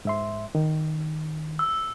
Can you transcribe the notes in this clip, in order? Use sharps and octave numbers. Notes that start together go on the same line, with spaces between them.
G#2 E5 C6
D#3
E6